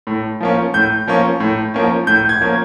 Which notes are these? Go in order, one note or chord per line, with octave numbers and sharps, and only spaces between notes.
A2
F3 A#3 C#4
A2 G6
F3 A#3 C#4
A2
F3 A#3 C#4
A2 G6
G#6
F3 A#3 C#4